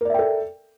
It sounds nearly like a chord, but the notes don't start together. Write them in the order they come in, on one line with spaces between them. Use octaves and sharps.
A#4 D5 E5 G5 A4